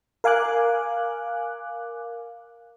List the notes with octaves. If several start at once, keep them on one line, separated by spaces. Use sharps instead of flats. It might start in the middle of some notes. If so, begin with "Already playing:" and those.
A#4 F5 G#5 D6 F#6